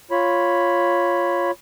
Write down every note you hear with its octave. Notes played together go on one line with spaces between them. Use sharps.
F4 C#5 B5